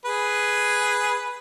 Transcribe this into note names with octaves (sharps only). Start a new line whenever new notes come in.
G#4 B4